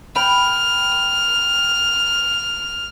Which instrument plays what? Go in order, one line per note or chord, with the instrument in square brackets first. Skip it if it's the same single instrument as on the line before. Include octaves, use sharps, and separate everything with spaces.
[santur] G5 B5 [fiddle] F6